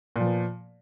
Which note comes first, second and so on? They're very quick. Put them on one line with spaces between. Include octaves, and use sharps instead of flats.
A#2 F3 B3